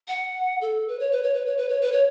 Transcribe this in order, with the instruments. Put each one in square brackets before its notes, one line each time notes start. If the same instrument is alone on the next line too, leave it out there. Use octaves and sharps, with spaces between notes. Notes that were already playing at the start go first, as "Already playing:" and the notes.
[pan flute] F#5
A4
B4
C#5
B4
C#5
B4
C#5
B4
C#5
B4
C#5